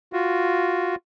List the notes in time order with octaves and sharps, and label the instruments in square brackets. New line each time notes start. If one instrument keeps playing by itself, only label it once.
[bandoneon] F4 F#4